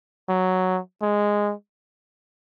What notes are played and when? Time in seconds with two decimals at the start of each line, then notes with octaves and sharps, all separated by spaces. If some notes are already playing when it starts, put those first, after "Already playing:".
0.29 F#3
1.02 G#3